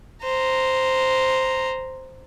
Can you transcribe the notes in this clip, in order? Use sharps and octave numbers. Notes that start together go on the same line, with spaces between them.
C5 A#5